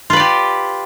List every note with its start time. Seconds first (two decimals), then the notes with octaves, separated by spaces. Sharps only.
0.10 F4
0.13 B4
0.16 D5
0.20 G4